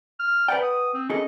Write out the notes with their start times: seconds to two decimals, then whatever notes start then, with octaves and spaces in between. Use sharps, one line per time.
0.20 F6
0.48 B4 D5 F#5 G5
0.62 D#6
0.94 C4
1.10 C#4 G#4 A4 D#5